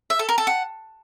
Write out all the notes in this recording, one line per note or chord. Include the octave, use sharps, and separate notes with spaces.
E5
A4
A#4
A4
F#5